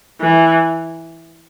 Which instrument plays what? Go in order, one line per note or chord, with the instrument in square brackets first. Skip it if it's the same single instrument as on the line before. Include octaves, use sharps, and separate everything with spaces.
[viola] E3